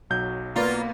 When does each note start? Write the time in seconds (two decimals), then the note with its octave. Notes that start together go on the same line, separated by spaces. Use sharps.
0.10 B1 F#3 G6
0.56 A#3 B3 F4 B4 D5 A#5